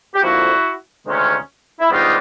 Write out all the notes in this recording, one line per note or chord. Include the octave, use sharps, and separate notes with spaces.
G4
F2 D3 F3 A#3 E4 F#4
D2 C3 D#3 G#3 C#4
E4
G#2 D#3 G3 B3 D4 D#4 F4